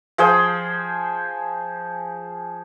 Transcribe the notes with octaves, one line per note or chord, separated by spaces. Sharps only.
F3 G#4 C5 G5